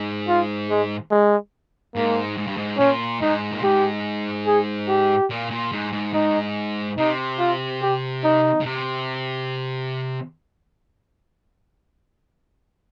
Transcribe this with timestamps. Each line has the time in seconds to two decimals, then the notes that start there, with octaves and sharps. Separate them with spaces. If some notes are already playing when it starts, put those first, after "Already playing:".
Already playing: G#2
0.28 F4
0.70 G#3
1.11 G#3
1.96 G#2 A#3
2.37 G#2
2.47 G2
2.57 G#2
2.78 A#2 C#4
3.21 G#2 D#4
3.51 A#2
3.62 G#2 G4
4.47 G#4
4.89 G4
5.30 A#2
5.51 A#2
5.72 G#2
5.93 G#2
6.13 G#2 D#4
6.98 C3 D#4
7.39 F4
7.82 G4
8.24 D#4
8.61 C#3
8.66 C3